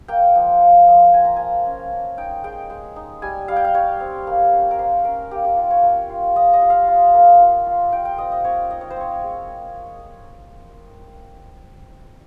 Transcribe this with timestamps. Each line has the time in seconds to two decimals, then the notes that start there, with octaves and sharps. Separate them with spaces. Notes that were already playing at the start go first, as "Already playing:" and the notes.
0.08 A#3 G5
0.35 F3
0.61 F3
0.87 F3
1.13 F4 G#5
1.25 A#5
1.36 A#3 G#5
1.65 C#4
1.92 C#4
2.18 D#4 G5
2.44 G#3 G5
2.70 G#3
2.96 D#4
3.22 G3 G#5
3.48 G3 F5
3.56 G5
3.64 F5
3.74 G3 C#5
4.00 C4
4.27 A#3
4.53 C#4
4.71 A#4
4.79 A#3 C5
5.05 C#4 A#4
5.31 A#3 G4
5.45 G4
5.57 F4
5.71 C#5
5.84 A#3
6.10 F4
6.36 F4 D#5
6.53 D#5
6.62 F4
6.70 F5
6.88 F4
7.14 A#3
7.40 F4
7.66 F4
7.92 F4 G5
8.05 G5
8.18 C4 D#5
8.32 D#5
8.44 C4 C#5
8.70 D#4 D#5
8.81 C#5
8.90 C5
8.97 C4 C#5
9.23 G#3